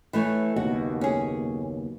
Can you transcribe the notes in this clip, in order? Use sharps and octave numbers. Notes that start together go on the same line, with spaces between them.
E3 A3 C#5
F#1 D#2 B2 F#4
C#4 G#4